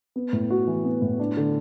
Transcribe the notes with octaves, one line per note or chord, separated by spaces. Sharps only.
B3
A2
F#4
E3
B3
A2
D4
D3